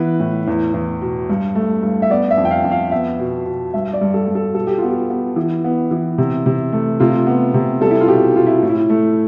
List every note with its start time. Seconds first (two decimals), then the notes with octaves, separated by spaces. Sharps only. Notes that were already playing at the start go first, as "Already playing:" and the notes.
Already playing: E3 B3 B4
0.20 A2
0.48 E2
0.74 E2
1.01 B2
1.29 G2
1.55 A3
1.83 G2
2.02 E5
2.10 B3 D5
2.31 E5
2.38 F2
2.45 G5
2.51 F5
2.64 F2
2.71 F5
2.92 B3 E5
3.19 B2
3.46 B2
3.74 G2 E5
3.93 D5
4.01 G2
4.14 A4
4.28 G2
4.35 A4
4.55 B2 A4
4.67 G4
4.78 B3 F4
4.88 G4
5.10 B3
5.36 E3
5.64 B3
5.91 E3
6.18 C3
6.46 C3
6.73 A3
7.00 C3 F4
7.27 B3
7.54 C3
7.81 G3 A4
7.91 E4
8.00 F4
8.08 B2 G4
8.36 B2 F4
8.47 E4
8.62 A2
8.70 E4
8.90 A3